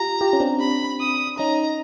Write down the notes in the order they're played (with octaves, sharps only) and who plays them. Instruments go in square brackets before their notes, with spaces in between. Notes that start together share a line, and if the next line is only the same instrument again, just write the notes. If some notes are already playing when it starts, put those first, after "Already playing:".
Already playing: [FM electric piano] F4 G4 [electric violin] A#5
[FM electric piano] F4 G4
C#4
C4 D4
[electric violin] B5
D#6
[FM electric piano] C#4 D#4 [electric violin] A#5